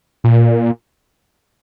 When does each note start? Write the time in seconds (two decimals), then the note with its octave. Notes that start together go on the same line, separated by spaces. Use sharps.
0.24 A#2